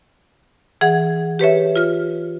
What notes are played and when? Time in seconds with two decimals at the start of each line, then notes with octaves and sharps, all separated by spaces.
0.81 E3 G#4 F#5 G#6
1.39 G4 B4 C#5 E5
1.76 F4 F6